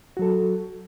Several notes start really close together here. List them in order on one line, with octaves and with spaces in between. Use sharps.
F#4 F#3 A4